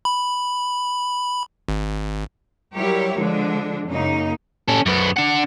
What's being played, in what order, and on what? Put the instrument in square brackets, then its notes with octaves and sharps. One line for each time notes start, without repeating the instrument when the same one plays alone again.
[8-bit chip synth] B5
G#1
[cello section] F#3 G3 E4 G4 A#4 C#5
D3 F3 G#3 D4
F#2 C#3 A#3 D#4
[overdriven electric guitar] C#4 A4
F#2 B3
D4 F#5